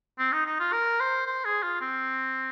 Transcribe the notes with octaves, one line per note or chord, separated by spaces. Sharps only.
C4
D#4
D#4
F4
A#4
C5
C5
G#4
F4
C4